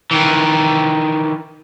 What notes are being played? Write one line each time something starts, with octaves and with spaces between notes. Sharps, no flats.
D#3 E3